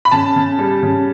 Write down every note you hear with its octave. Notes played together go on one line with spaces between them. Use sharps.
B5
C#3 A5
C#3
G3
C#3